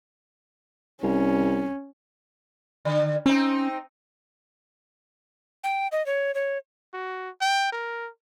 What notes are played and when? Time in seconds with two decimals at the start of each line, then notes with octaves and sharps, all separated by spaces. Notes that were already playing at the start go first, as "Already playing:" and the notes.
1.03 C2 C#4
2.85 D3
3.26 C4 C#4 D#4
5.64 G5
5.92 D#5
6.06 C#5
6.35 C#5
6.94 F#4
7.41 G5
7.73 A#4